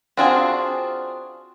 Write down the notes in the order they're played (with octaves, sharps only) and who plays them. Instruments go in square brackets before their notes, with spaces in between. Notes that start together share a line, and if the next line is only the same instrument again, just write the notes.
[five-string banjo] C4 D4 F4 F#4 G#4